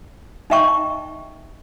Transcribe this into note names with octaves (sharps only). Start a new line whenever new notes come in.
D#4 D#5 E5 G5 C#6